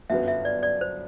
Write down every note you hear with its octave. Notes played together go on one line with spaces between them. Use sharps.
G1 F#2 F#3 B3 E5
E5
D5
D5
C5